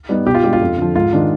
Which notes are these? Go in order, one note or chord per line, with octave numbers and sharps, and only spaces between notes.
G3 B3 D#4
B2 G4
F4
G#3 D4 G4
F4
F2
D3 F3
G#2 F4
D#3 G#3 D4